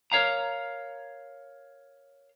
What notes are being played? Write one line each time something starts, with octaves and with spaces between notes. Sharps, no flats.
A#4 C#5 F5 A#5